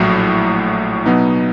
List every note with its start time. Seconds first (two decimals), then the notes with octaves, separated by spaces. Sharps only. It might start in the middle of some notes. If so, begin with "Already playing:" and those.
Already playing: A#1 A2 F#3
1.06 B2 F#3 B3 D#4